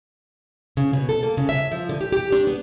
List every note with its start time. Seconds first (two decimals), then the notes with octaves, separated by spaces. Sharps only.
0.77 C#3
0.93 B2
1.09 A4
1.23 A#3
1.37 C#3
1.49 E5
1.72 F3
1.89 D3
2.01 G4
2.12 G4
2.32 D4
2.47 B3